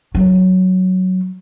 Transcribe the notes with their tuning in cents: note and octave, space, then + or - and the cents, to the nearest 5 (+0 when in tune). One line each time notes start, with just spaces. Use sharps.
F#3 +5